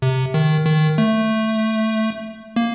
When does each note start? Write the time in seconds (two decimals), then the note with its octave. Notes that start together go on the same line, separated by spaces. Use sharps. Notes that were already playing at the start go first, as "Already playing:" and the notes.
0.02 C3
0.34 D#3
0.65 D#3
0.98 A3
2.56 A#3